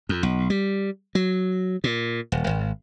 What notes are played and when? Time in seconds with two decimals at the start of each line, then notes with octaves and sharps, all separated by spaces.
0.09 F2
0.23 B1
0.50 G3
1.15 F#3
1.84 A#2
2.32 D#1
2.47 G#1